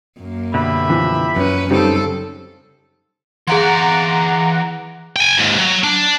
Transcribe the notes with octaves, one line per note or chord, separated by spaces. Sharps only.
F#2 A#3
B2 D3 G4 E5 B5
E3 F3
F#2 C#4 B4
C#3 G3 C4 D#4 A4
E3 G#4 D5 F5 F#5 A#5 C6
G5 G#5
D#2 G#2
F#3
D4